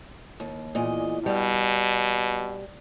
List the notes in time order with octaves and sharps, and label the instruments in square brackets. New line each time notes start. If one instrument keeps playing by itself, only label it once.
[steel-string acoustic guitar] D#2
E2 A#2 D#5
[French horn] B2 [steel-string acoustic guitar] G3